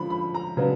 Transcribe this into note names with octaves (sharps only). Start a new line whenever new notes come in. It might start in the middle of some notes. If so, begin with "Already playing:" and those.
Already playing: D3 F3 B5
B5
A#5
C#3 F#3 B3 D4